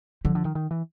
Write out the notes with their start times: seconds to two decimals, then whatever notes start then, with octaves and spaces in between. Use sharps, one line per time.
0.25 D3 F3
0.35 D3
0.45 D#3
0.55 D#3
0.71 E3